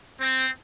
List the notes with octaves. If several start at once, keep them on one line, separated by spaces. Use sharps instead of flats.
C4